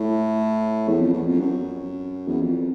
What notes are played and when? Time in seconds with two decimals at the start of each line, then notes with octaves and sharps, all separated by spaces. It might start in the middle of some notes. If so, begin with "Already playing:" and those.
Already playing: A2
0.88 E2
1.00 F2
1.13 E2
1.27 F2
1.40 F#2
2.28 E2
2.42 F2